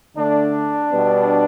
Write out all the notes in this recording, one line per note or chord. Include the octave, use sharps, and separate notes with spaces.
D3 A3 D4
B2 G3 B3